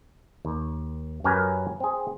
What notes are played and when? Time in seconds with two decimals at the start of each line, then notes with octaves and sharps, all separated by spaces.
0.45 D#2
1.24 F#2 C#4 G4 A#4 B4 G#5
1.80 C4 G#4